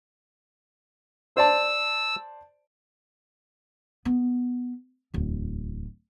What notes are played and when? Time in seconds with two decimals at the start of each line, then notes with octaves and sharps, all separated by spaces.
1.37 C5 D5 A5 E6
4.05 B3
5.14 D1 E2